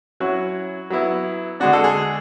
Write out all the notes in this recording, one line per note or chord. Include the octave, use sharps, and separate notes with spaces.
F#3 C#4 E4 F#4
F#3 B3 E4
D3 G#3 D4 F#4
A4
G#4